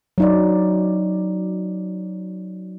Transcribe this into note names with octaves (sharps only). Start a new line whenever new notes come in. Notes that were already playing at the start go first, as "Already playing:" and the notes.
F#3 D#4 D5